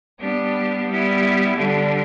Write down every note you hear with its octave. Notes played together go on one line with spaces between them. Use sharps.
G3 B3 D4 G4
G3 B3 E4
D3 G3 D4